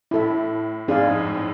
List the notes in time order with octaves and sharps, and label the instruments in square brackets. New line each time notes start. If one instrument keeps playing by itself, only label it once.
[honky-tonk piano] A2 [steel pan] E4 A4 E5
[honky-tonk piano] G#2 [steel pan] C4 G#4 D5 F5
[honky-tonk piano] F2
A2